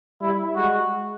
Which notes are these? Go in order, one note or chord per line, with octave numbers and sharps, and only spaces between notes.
G3 E4
G#3 F#4